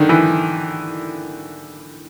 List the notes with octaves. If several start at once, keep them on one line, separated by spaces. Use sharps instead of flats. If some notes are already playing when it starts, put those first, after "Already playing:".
Already playing: D3 D#3
E3